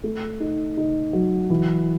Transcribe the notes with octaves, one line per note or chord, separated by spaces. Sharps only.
A3
D#4
D#4
F#3
E3